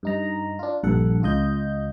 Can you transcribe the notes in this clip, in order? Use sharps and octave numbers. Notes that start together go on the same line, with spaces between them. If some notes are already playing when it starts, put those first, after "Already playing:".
G2 D#4 A#5
D4 F4
A#1 G2 A4 F#5
C#2 F4 D#5 G6